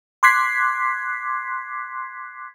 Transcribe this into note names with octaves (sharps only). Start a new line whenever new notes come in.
C6 D6 F#6 G#6 B6 C7